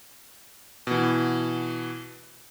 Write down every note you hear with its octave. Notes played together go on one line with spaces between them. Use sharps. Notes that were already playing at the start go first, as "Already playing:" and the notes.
B2 E3